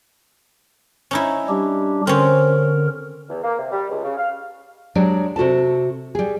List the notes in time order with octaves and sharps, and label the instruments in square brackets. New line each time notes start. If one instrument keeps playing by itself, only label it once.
[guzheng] C#4 D#4 E4
[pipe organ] G3 D4 G4
[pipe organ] D3 A#4 [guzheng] C4 C#4
[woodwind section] E2
A#3
C3
G3
C#2
C#3
F5
[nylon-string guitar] F#3 G#3 D4 G4 D5
C3 F#4 A4 A5
G3 G#4